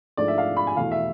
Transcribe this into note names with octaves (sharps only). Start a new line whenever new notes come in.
G#2 F3 A3 D4 D5
E5
F5
B5
G#5
E2 B2 A3 F5
E5